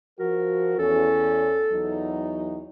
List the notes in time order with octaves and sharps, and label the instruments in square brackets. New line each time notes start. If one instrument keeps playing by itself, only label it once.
[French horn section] F3 F#4 [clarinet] A#4
[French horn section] E2 C#4 [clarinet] A4
[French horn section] E2 F#3 D#4